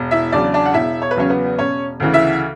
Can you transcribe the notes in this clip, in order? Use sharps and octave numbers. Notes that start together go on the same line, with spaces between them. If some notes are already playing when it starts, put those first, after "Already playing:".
Already playing: E1
E4 E5
E2 C#3 F#3 D4 D5
D4 D5
F#5
E1 E4 E5
C#5
B4
E2 C#3 F#3 C#4 C#5
B3 B4
E1 C#4 C#5
D2 C#3 E3
E4 E5